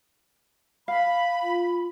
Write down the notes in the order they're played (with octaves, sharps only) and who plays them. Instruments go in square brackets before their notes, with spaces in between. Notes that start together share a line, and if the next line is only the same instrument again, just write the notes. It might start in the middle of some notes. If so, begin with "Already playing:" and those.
[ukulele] F5 [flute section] B5
[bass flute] F4